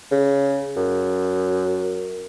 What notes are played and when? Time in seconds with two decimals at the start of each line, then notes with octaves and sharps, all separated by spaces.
0.11 C#3
0.76 F#2